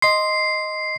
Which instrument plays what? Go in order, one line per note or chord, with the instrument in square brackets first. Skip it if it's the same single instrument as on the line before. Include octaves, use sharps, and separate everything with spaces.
[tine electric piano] D#5 C6 [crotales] C7